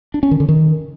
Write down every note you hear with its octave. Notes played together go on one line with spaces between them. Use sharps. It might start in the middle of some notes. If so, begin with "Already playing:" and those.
D4
C#4
D#3
D3
D#3